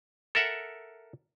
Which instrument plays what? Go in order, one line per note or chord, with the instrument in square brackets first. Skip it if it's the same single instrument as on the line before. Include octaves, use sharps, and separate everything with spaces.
[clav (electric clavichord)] A4 A#4 E5 F#5